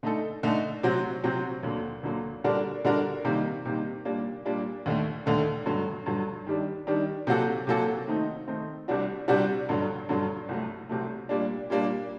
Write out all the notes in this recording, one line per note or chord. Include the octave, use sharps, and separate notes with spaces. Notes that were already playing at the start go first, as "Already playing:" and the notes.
D3 A3 D#4 A4
D3 A3 D#4 A4
C3 F#3 C4 F#4
C3 F#3 C4 F#4
D2 D3 F#3 A#3
D2 D3 F#3 A#3
D3 G3 D4 F#4 A#4
D3 G3 D4 F#4 A#4
C3 D#3 G3 A#3
C3 D#3 G3 A#3
A#2 G3 A#3 D4
A#2 G3 A#3 D4
D#2 D3 A3
D#2 D3 A3
G2 D3 F#3
G2 D3 F#3
D#3 G3 D4
D#3 G3 D4
C3 F#3 A#3 F#4 A4
C3 F#3 A#3 F#4 A4
D#3 A3 C4 D#4
D#3 A3 C4 D#4
C2 C3 G3 D4 F#4
C2 C3 G3 D4 F#4
G2 D3 F#3
G2 D3 F#3
C2 C3 F#3 A3
C2 C3 F#3 A3
A#2 G3 A#3 D4
A#2 G3 A#3 D4